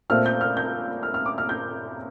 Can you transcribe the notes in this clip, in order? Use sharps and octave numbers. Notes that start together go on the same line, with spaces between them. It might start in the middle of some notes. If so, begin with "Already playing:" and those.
A#2 A3 C4 F6
G6
F6
G6
F6
F6
D6
F6
G6